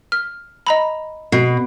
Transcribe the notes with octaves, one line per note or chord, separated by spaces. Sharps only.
F6
D#5 A#5 B5
B2 C7